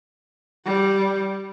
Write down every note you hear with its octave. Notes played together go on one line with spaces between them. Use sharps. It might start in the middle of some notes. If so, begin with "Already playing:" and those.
G3